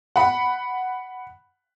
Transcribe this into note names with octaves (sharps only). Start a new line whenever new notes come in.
F#5 B5